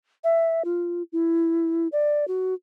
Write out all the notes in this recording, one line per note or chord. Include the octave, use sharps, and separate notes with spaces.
E5
F4
E4
D5
F#4